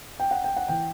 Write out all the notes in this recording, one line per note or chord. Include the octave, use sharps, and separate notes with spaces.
G5
F#5
G5
F#5
E3 G5